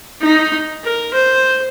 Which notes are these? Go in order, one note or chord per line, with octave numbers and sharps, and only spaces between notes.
D#4
A#4
C5